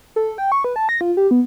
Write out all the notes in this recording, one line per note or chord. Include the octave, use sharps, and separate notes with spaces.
A4
G5
C#6
B4
A5
A#6
F4
G4
B3